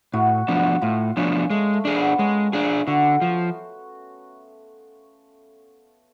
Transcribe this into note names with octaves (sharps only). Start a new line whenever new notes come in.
A2 F#4
F3 B3 D4 F#4
A2 F4
F3 B3 C#4 D4
G#3 A3
A3
D4 G#4
B3
G#3 C#4
D4 F4 G#4
D3 F#4
F3